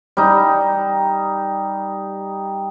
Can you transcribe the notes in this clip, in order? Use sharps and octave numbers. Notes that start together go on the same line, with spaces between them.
G3 D#4